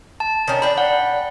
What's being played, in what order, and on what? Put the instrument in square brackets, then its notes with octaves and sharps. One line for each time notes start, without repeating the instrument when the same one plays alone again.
[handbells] A5
[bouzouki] D#3 C#4
[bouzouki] D4 G5 [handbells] B5
[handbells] F#5